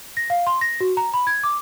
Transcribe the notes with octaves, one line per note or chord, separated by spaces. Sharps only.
A#6
F5
C6
A#6
F#4
A#5
B5
G#6
D6